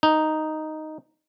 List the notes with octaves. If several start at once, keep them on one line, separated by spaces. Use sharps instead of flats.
D#4